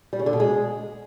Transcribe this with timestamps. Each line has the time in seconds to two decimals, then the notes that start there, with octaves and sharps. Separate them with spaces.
0.13 G3
0.19 C#3
0.26 D3
0.33 B2
0.40 G#3